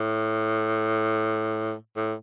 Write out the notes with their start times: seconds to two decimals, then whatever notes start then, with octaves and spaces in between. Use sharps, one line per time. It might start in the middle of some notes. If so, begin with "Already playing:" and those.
Already playing: A2
1.97 A2